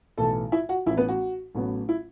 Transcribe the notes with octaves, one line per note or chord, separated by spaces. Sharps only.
B1 A2 E3 A3 A4 A5
E4 E5
F#4 F#5
A1 A2 E3 E4 E5
B3 B4
F#4
A1 A2 F#3 B3
E4